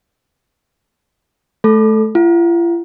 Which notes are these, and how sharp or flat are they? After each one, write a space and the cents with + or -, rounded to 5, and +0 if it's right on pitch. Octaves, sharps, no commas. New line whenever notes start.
A3 -25 A4 +0
F4 -45 F#5 +0